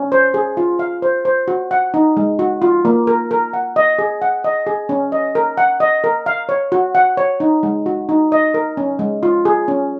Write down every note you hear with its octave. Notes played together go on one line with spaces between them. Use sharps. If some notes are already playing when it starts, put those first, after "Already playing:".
Already playing: C#4
C5
G#4
F4
F5
C5
C5
F#4
F#5
D#4
G#3
F#4
F4
A#3
A#4
A#4
F#5
D#5
G#4
F#5
D#5
G#4
C#4
D#5
A#4
F#5
D#5
A#4
F5
C#5
F#4
F#5
C#5
D#4
G#3
F#4
D#4
D#5
A#4
C#4
G#3
F4
G#4
C#4